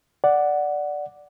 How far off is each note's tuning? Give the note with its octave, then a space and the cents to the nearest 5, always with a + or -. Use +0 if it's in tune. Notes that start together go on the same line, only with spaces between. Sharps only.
D5 +0 F#5 +0